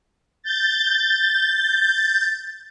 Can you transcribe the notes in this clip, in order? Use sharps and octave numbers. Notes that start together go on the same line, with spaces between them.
G6 A6